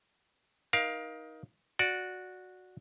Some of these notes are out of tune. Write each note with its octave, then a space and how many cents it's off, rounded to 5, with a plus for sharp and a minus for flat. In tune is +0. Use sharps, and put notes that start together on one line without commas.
D#4 +15 A#4 +30 F5 +0
F#4 -10 D5 +0